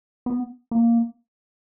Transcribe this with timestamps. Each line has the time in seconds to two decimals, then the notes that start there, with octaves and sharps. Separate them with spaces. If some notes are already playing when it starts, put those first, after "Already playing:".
0.26 B3
0.71 A#3